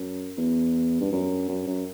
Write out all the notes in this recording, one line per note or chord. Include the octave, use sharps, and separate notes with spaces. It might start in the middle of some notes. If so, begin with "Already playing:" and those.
Already playing: F#2
E2
G2
F#2
F#2
F#2